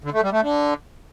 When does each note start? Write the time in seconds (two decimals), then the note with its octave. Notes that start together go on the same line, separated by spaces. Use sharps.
0.04 D3
0.13 A3
0.23 G3
0.32 A3
0.41 D3